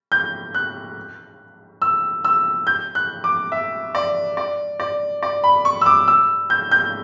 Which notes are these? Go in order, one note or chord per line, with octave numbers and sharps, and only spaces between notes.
G6
F#6
E6
E6
G6
F#6
D6
E5
D5
D5
D5
D5
B5
C#6
E6
D6
E6
G6
G6